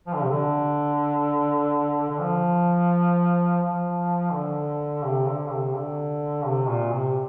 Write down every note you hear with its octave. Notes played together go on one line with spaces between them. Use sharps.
F3
D3
C3
D3
D3
F3
F3
D3
C3
D3
C3
D3
C3
A#2
C3